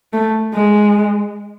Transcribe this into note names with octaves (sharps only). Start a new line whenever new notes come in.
A3
G#3